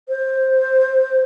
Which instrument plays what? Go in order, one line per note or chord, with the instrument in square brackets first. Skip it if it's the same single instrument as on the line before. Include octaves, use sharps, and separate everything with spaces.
[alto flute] C5